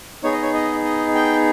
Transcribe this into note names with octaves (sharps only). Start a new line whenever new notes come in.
B3 D#4 G#4 C#5
D#5
C#5
D#5
D#5
G5